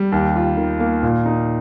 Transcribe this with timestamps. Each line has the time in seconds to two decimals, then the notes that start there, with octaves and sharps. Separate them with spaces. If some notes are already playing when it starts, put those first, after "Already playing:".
Already playing: G3
0.12 D#2
0.36 F4
0.57 D#3
0.80 A#3
1.03 A#2
1.26 D#4